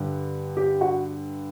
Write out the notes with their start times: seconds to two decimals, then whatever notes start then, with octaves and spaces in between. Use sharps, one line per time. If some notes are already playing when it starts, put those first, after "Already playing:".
Already playing: G2 D3
0.57 G4
0.81 F#4